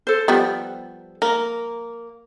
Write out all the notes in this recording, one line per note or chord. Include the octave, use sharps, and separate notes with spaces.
A4 C5
F3 G3 B3
A#3 A#4